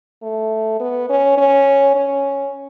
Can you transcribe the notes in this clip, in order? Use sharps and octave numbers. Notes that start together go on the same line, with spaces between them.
A3
B3
C#4
C#4
C#4